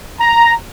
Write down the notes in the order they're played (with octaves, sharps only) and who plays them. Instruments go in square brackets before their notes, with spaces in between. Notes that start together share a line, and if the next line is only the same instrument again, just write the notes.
[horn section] A#5